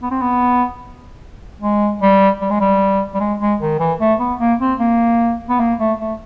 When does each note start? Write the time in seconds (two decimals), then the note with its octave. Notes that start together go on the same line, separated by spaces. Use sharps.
0.02 B3
0.11 C4
0.21 B3
1.61 G#3
2.02 G3
2.41 G3
2.51 G#3
2.61 G3
3.14 G3
3.20 G#3
3.40 G#3
3.61 D#3
3.80 E3
4.01 A3
4.20 B3
4.40 A#3
4.60 C4
4.79 A#3
5.49 B3
5.60 A#3
5.79 A3
5.99 A3